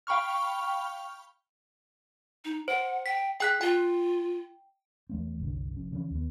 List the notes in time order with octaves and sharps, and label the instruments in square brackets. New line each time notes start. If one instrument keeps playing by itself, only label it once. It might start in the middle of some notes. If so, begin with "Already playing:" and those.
[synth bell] F5 G5 B5 C#6 F6
[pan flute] D#4
[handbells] C5 [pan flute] F#5
[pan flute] G5 [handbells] B6
[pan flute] G#4 [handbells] G5 F#6 B6
[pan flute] F4 [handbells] G5
[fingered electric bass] E2 A3 C4
F#1 C2 D3
F1 C#4
C#3 E3 A3 C#4
D#2 B3